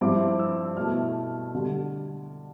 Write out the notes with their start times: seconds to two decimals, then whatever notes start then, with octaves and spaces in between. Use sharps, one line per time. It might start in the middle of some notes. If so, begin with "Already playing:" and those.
0.01 G2 F3 C4 E4 D6
0.39 E6
0.77 B2 A3 E4 F6
1.54 D3 G3